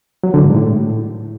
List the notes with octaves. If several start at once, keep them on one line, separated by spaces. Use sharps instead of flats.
F#3
D3
G#2
A2